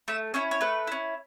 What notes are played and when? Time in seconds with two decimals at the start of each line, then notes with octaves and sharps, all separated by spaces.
0.08 A3 E5
0.34 C#4 E4 C#5
0.51 C#5
0.61 A3 B4
0.87 C#4 E4